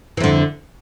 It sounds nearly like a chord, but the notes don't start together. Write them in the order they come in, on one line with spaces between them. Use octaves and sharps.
E3 F2 D3